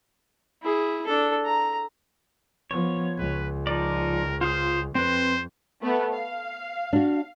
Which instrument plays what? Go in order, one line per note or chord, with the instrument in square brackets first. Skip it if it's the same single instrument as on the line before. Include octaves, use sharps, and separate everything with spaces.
[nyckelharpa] E4 G#4
D4 A4
A#5
[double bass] F3 B3 [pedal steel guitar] C#5
[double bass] C#2 [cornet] B4
[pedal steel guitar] F3 D#4 D5 [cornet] A#4
[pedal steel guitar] F4 F5 D#6 [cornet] C5
[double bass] F2 [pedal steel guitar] C4 B4 [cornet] C5
[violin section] A3 B3 B4
F5
[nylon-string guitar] D4 F#4